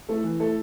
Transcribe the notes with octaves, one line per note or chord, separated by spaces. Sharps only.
A3 E4 A4
E3
A3 E4 A4